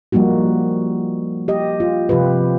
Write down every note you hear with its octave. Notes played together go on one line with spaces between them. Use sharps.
F3 G3 A#3 D#4 F#4
G4 D#5
F4
C3 F3 F4 G4 B4